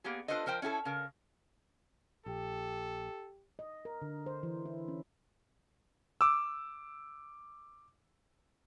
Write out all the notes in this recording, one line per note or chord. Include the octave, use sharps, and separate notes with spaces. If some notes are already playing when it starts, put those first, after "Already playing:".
A#3 B3 G4 G#4
D4 F4 A4 B4 C5 D#5
F3 A#4 C5 G5
C#4 E4 G4 A4
C#3 A#4
A#1 G4 A4
D#5
A#4
D3
C5
E3
E4
C#4
D6 E6